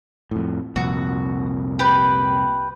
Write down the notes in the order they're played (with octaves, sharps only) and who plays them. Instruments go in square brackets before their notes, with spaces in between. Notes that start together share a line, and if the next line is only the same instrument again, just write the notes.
[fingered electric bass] F2 A2
[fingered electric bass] C2 F2 A#2 [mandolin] F#4
[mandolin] G4 B4